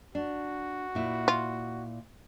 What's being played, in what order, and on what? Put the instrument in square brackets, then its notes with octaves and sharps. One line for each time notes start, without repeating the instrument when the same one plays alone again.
[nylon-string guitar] D4 [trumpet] F#4
[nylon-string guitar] A#2 E4
[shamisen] F4